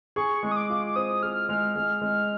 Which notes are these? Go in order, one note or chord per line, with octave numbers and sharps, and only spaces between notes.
G#4 C#6
G#3
D#6
D6
F4
D6
C4 D#6
G#4 F6
G#3 F6
G#3
G#3